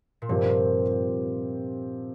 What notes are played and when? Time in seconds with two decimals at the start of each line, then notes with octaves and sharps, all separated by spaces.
0.22 A#2
0.29 G2 C3 F3 C4 G4